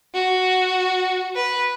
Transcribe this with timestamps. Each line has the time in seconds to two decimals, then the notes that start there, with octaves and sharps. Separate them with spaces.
0.14 F#4
1.36 B4